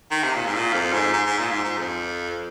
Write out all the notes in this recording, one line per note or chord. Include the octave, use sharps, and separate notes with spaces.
D#3
C3
A#2
G#2
A#2
F2
G#2
G#2
G#2
A#2
G#2
G#2
F2